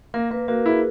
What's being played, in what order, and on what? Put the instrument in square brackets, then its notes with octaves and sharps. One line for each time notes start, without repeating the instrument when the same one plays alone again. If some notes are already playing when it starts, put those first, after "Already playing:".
[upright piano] A#3 [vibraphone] A#4
[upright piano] A#3 [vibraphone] B4
[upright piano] A#3 [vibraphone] F#4
[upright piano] E4 [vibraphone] G#4